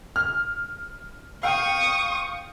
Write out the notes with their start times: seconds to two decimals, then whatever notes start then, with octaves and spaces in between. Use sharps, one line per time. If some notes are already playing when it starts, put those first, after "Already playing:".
0.16 F6
1.43 F5 G5 C#6 D#6